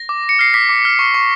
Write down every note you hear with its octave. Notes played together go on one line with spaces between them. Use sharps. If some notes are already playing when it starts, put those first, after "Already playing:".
Already playing: A#6
D6
D6
C#7
F6 C7
D6 B6
D6
F6
C#6
C#6